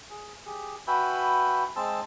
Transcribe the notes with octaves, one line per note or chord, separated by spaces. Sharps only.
G#4
G4 G#4
F#4 B4 E5 G5 G#5 B5
G#3 C4 G#4 C5 A5 E6